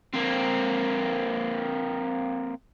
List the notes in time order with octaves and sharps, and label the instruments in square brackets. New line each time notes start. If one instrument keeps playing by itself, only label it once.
[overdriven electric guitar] A#3 C4